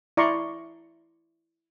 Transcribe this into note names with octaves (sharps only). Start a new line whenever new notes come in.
E4 D5 A#5 C6 C#6